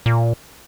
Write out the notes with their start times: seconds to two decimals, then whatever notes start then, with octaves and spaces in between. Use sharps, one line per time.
0.06 A#2